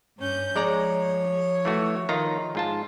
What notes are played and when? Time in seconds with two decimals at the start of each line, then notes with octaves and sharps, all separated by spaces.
0.19 G2 C#4 G6
0.56 F3 G#3 C#5 D5 A#5
1.65 E3 A3 F#4
2.09 D#3 F4 A#5
2.55 G#2 F4 A5